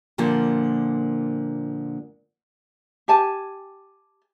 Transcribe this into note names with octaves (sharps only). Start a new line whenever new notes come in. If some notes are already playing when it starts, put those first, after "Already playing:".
A#2 D3 F3 A#3 F4
G4 G#5 A5